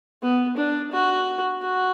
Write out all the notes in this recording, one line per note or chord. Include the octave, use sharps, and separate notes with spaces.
B3
D4
F#4
F#4